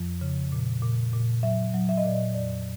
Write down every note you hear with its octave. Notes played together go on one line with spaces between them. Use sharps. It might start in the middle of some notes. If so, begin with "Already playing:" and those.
Already playing: F2 F3
C#3
A#2
A#2
A#2
F#3 E5
F#3
E5
D#5
A#2 D5
D#5
F2 D5